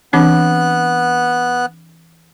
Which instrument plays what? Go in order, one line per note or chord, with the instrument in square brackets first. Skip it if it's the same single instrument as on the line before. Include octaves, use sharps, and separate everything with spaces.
[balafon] E3 C4 D4 [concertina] B3 F#6